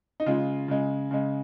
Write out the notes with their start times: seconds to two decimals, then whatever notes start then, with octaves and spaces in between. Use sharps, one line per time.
0.20 D#4
0.26 C#3 G#3 F4
0.68 C#3 G#3
1.11 C#3 G#3